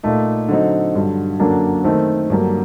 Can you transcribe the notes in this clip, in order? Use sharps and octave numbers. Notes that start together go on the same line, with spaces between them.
A#2 A3 D#4
D3 F#3 C4 D#4
G2 D3 F#3
F#2 D3 F#3 A#3 D4
D#3 A3 C4
G2 D3 F#3 A#3